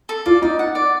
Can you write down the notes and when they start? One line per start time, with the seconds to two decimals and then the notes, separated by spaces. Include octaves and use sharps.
0.09 A4
0.26 F4 D5
0.42 D#4 D5
0.59 F#5
0.75 D5